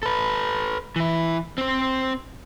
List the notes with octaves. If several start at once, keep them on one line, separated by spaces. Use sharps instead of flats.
A4 B4
E3 E4
C4 C5